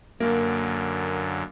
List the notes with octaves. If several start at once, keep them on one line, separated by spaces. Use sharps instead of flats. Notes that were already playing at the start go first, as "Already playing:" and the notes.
F#2 D3 A#3